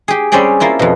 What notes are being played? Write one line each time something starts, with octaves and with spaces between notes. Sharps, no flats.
G4 G#4
G3 C4 C#4 G4 G#4 D5
A#3 E4 F4 A5
F2 B2